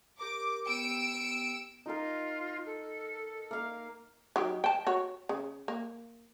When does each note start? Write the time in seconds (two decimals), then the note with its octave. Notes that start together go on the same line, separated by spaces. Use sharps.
0.19 G4 A#4 A#5 D6
0.66 B3 G4 G5 E6 C#7 D7
1.86 D#4 F4 A#4
2.66 A4
3.51 A#3 F5
4.36 D#3 F#3 G4
4.64 G5 A5
4.87 F#4 C#5
5.29 C#3
5.68 A#3